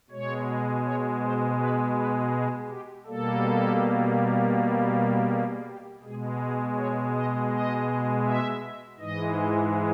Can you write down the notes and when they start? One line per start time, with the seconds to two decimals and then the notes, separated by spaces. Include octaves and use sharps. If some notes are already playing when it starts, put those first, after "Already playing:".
0.10 B2 G#3 C#5
0.84 C#5
1.22 C5
1.58 B4
1.96 B4
2.32 G#4
2.69 G4
3.06 B2 G3 A#3 A4
5.29 G#4
5.66 G4
6.03 B2 G#3 G#4
6.40 G#4
6.77 C#5
7.14 D#5
7.51 D#5
8.25 E5
8.99 G#2 E3 G#3 D#5